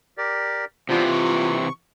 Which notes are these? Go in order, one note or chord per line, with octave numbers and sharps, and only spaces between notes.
G4 A#4 D5
C3 E3 B3 D4 F4 C5
C#6